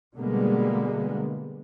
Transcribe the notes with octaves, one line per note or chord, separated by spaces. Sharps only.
B2 D3 G3 G#3 A#3 B3